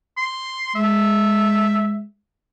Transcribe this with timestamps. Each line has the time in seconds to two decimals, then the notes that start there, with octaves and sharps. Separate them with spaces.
0.17 C6
0.75 G#3 E5